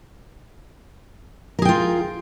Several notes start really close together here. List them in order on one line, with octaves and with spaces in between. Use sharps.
A#4 G#4 G5 F4